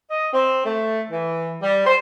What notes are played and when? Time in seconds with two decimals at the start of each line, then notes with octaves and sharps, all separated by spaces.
0.11 D#5
0.33 C4
0.65 A3
1.12 E3
1.62 G3
1.87 C5